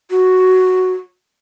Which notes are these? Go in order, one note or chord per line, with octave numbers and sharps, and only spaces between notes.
F#4